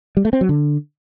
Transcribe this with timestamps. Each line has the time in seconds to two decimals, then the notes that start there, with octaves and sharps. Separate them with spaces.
0.17 G3
0.25 A3
0.33 C4
0.41 F#3
0.49 D3